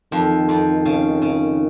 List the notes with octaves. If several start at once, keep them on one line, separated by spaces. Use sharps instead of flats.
F2 D#3
F2
C#3
C#3